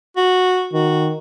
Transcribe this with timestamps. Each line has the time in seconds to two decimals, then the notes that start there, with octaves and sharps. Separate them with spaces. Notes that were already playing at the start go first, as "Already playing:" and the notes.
0.17 F#4
0.73 D#3 F#4